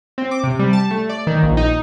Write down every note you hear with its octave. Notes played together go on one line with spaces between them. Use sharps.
C4
D6
C3
G3
A5
A3
D5
D#3
A#1
D#4